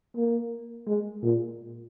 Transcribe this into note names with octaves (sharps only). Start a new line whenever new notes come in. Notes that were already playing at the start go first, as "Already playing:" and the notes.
A#3
G#3
A#2